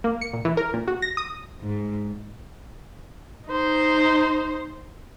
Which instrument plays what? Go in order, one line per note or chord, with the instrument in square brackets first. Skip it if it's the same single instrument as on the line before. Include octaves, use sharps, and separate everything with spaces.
[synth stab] A#3
C#7
A#2
E3
A#4
A#2
F#4
A#6
D#6
[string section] G#2
[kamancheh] D#4 C5